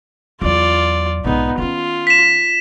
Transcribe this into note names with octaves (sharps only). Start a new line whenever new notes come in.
E2 F#3 F4 D5
B1 G#2 B3 D#4
D#3 C#4 F4
B6 E7